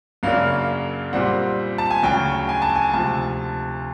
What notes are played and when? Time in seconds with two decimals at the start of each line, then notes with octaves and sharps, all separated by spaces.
0.23 F#2 C#3 F#3 A#3 D4 F5
1.13 A#2 G3 C4 F#5
1.78 A5
1.91 G#5
2.03 D2 C#3 F#3 G5
2.49 G#5
2.62 A5
2.76 G#5
2.93 D2 C3 F3 A5